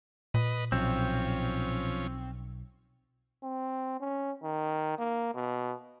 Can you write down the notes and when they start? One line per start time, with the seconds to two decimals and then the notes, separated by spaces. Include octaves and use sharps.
0.34 A#2 B4 D#5
0.72 B1 F3 C4 C#4
3.43 C4
4.00 C#4
4.43 D#3
4.98 A#3
5.35 B2